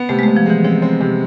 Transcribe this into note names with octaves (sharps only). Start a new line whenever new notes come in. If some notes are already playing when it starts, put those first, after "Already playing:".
Already playing: B3
C3 A3
G#3
C3 A3
F3
E3 G#3
F3 C4
C4
C3